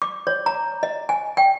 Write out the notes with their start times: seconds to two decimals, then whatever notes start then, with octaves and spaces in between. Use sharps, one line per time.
0.02 D6
0.27 C#5
0.46 A#5
0.83 D#5
1.09 G#5
1.37 G5